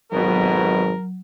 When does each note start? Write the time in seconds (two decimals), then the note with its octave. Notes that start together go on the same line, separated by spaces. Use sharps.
0.12 G#1 F2 B2 F#3 A#4